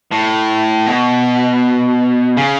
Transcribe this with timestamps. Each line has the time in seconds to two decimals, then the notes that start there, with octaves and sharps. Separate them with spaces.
0.11 A2
0.87 B2
2.37 C#3